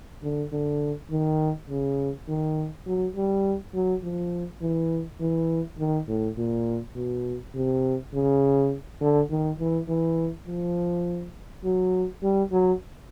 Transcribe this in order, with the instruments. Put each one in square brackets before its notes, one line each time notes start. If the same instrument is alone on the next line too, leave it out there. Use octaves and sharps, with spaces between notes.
[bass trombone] D3
D3
D#3
C#3
D#3
F#3
G3
F#3
F3
E3
E3
D#3
A2
A#2
B2
C3
C#3
D3
D#3
E3
E3
F3
F#3
G3
F#3